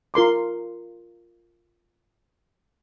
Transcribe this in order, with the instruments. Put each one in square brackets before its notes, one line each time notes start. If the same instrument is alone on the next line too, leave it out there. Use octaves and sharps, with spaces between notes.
[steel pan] F4 A#4 C6 D6